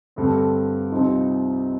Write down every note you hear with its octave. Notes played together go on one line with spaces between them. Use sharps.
G2 D3 A3 C4
C2 C3 F3 C4 D#4